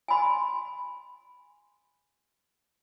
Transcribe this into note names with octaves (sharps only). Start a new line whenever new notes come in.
G#5 B5 C6